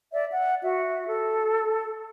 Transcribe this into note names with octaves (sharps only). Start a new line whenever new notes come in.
D5 E5
F#5
F#4 E5
A4